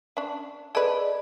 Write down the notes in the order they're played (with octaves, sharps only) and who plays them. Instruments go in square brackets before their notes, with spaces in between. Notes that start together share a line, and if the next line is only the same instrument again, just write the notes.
[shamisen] C#4 D4
[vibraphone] G#4 D5 D#5 [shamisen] A4 B4